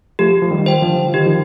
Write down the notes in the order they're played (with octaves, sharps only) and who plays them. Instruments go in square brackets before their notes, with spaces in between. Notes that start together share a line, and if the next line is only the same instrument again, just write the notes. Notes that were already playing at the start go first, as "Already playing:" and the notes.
[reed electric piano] F3 A3 [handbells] G4
[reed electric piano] F3
D#3 G3
[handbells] C5 G5
[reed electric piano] D3 F3
[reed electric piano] D#3 [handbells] G4
[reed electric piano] F3